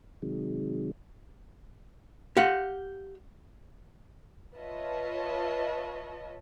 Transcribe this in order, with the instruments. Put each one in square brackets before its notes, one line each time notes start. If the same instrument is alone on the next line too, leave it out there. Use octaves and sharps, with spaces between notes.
[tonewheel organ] C3 D#3 F#3 G#3
[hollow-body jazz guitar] G4 F5 F#5
[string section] F4 B4 C#5 D#5 E5 A5